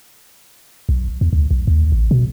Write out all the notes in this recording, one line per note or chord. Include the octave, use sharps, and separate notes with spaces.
B1
E2
D2
B1
D#2
A1
B2